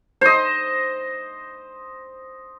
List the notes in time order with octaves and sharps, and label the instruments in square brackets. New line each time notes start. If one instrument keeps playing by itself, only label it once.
[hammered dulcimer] C5 D#5